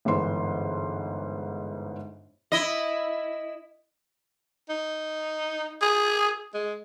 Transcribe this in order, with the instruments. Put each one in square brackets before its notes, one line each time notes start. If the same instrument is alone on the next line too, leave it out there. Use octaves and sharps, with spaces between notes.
[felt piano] G1 G#2 E3 C6
[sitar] E4 D#5
[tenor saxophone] D#4
G#4
G#3